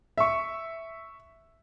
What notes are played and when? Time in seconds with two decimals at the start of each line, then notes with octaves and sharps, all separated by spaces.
0.18 E5 C#6